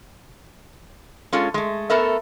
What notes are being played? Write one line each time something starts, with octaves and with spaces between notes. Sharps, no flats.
G#3 C#4 F4 A4
G#3 A3
A3 B3 A4 A#4 E5